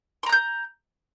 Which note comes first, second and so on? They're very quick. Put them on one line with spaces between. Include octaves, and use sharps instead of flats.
C6 A#5 F#6 G6